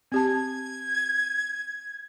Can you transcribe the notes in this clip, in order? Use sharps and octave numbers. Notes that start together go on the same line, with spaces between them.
C4 G4 A5 G#6